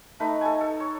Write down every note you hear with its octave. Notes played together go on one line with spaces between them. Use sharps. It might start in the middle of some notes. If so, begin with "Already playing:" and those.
A3 D#4 B4
A4 G#5
A4
C#5